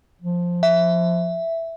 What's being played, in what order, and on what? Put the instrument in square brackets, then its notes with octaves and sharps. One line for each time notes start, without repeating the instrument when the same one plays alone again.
[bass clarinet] F3
[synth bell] E5